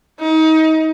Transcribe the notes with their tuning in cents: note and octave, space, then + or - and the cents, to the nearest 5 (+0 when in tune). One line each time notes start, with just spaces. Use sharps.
D#4 +30